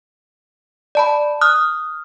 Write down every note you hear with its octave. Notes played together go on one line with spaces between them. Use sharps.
D5 A5 B5
D#6 F6 F#6